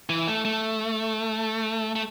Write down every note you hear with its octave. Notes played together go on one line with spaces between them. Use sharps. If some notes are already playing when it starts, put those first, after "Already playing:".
E3
A3
A3
A3